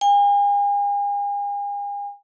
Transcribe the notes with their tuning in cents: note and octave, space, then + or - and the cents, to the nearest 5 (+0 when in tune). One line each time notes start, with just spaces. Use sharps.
G#5 -45